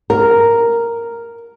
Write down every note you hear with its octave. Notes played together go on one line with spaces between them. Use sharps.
A#4